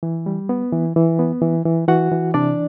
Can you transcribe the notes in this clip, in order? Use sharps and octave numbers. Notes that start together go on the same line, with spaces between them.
E3
G3
B3
E3
E3
B3
E3
E3
E3 F#4 F#5
E3
C3 D4 D5